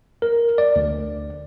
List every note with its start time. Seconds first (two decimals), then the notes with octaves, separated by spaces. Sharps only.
0.22 A#4
0.58 D5
0.76 D2